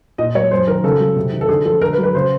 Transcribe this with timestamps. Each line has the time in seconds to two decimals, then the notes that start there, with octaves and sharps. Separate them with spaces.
0.18 A#2 D#5
0.35 F#3 C#5
0.51 F#2 C5
0.67 D#3 A#4
0.84 C#3 A4
1.00 F#3
1.16 C3
1.32 D#3
1.41 A4
1.49 D3 G#4
1.65 F3 A4
1.82 D3 A#4
1.93 B4
1.98 F#3
2.03 B4
2.14 C#3 C5